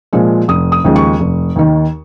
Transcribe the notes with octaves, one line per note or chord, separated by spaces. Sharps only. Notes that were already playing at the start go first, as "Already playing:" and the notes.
A#2 F3 G#3
F1 D#6
D#6
D#2 C#3 F3 G#3
C#6
F1
D#2 D#3